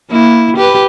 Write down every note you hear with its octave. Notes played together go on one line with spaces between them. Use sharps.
A#3 E4
G4 B4